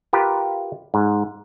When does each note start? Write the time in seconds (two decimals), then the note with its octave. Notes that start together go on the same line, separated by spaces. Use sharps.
0.13 F4 G4 A#4 B4
0.94 G#2